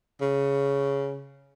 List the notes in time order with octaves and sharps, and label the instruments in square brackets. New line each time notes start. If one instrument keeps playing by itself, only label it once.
[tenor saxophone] C#3